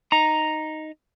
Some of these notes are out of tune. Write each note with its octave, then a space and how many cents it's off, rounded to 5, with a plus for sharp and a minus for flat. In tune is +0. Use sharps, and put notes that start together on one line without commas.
D#4 +0 A#5 +0